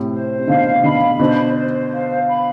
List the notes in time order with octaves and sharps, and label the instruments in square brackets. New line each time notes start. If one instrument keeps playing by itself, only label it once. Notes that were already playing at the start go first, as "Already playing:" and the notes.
Already playing: [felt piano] A2 C3
[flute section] C5
[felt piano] C3
[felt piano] B2 D3 [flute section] F5
[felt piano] B2 D3 [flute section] B5
[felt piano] B2 D3 [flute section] C5
[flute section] C5
F5
B5